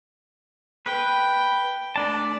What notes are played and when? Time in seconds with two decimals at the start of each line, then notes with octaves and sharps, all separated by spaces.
0.86 B4 G5
1.96 A3 D4 D5 A5